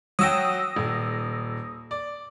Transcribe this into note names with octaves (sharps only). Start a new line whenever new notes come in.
F#3 F#4 G5 D#6 E6 A#6
D#1
D5